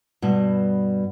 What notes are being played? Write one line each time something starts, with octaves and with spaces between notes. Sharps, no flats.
G2 B2